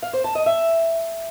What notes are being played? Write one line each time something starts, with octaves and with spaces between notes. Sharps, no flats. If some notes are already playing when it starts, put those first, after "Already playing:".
F5
C5
A5
D#5
E5